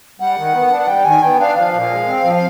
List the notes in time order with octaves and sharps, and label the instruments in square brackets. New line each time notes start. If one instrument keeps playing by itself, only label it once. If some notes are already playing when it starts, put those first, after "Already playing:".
[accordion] G3 [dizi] F#5
[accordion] D#3
B3
D4
[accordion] G3 [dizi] G5
[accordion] D#3 [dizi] G#5
[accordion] B3 [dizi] G5
[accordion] D4 [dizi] F5
[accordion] F3 [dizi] F5
[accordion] A#2
G#3
C4
F3